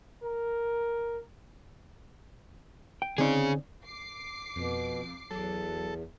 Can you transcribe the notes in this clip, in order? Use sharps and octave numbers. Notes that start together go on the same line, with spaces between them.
A#4
G5
D3 C4 C#4 D#4 G#4
D6 C7
F2 B2
E2 F#3 A4